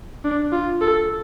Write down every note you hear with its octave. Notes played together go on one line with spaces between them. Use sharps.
D4
F4
A4